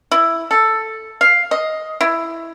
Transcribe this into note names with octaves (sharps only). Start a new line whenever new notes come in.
E4
A4
F5
D#5
E4